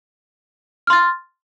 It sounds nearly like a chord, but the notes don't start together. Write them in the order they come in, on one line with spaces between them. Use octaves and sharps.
F6 C6 A6